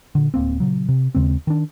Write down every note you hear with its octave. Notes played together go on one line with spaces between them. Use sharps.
A#2 D3
D1 A#3 C4
A#2 C#3 F#3
C3
D#2 C#3 G#3 C4
D#3 D4